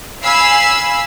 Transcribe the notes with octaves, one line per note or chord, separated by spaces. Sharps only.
F5 G#5 B5 E6 C7